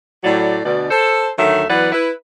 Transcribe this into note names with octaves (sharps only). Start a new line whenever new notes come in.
A2 F#3 D5
D2 B2 D5
A4 C5
D2 D#3 F#3 A3 E5
E3 F#3 B3 B4 D5 F#5
E4 B4